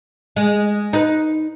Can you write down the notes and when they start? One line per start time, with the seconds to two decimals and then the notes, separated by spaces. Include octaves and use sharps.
0.36 G#3
0.93 D#4 B4